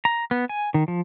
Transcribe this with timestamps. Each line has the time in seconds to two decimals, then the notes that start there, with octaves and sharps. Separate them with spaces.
0.05 A#5
0.31 B3
0.49 G#5
0.74 D#3
0.88 F3